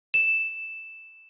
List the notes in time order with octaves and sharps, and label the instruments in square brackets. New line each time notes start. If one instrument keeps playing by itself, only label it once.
[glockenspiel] E7